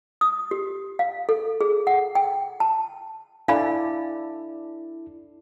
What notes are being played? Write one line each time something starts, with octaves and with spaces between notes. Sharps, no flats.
D#6
G4
F5
A4
G#4
F#5
G5
A5
D4 E4 A4 D5 F5 G#5 B5